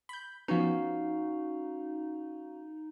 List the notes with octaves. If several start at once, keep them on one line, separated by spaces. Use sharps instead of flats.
B5 G6
F3 B3 C#4 D#4 F#4 F5